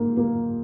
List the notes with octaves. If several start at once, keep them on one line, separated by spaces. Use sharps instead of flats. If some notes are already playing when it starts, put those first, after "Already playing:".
Already playing: G#2 A#3
A#3